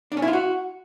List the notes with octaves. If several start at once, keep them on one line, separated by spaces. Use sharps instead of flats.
D4
C#4
E4
F4
F#4